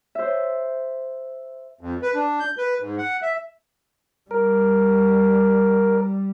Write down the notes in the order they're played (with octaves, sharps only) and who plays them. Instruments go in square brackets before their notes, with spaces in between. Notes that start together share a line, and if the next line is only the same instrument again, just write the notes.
[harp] C5 E5
[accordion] F2
B4
D4
G6
B4
G#2
F#5
E5
[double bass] G3 [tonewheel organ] A#4